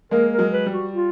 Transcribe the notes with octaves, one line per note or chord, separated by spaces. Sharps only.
G#3 A#3 A#4
A#4
F#3 G#3
B4
G3
F#4
F4